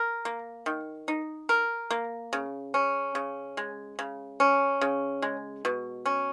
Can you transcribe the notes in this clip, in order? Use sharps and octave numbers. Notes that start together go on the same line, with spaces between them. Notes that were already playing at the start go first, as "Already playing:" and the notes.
Already playing: A#4
A#3
D#3
D#4
A#4
A#3
C#3
C#4
C#3
G#3
C#3
C#4
C#3
G#3
B2
C#4